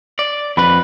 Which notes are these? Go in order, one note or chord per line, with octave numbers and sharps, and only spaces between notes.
D5
F2 B4 B5